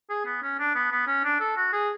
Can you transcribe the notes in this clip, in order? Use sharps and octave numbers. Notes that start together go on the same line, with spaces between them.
G#4
B3
C#4
D4
B3
B3
C#4
D4
A4
F#4
G#4